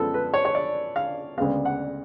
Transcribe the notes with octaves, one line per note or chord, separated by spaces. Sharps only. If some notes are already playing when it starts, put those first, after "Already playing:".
Already playing: F#2 F3 G#3 B3 A4
B4
C#5
C#5
D5
F5
D2 C#3 G#3 B3 F5
F#5